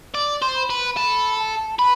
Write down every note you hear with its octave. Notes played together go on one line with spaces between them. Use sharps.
D5
C5
B5
B4
A4 B5
A5
B4 B5